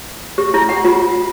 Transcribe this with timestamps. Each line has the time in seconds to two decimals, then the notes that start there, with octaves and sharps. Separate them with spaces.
0.38 G4
0.54 E4
0.69 F#5
0.85 F4